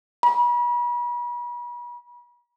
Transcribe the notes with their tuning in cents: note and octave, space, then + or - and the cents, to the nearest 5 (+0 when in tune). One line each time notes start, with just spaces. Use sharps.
B5 -40